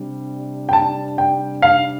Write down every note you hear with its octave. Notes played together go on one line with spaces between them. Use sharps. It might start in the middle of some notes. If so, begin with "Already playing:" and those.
Already playing: C3 G3 D4
G5
A5
G5
F5